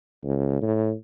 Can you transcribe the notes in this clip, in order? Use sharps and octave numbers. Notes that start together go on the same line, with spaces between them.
C#2
A2